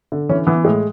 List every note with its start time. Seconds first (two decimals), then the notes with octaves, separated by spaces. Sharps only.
0.12 D3
0.29 E3 C#4
0.46 E3 B3
0.65 A2 G#3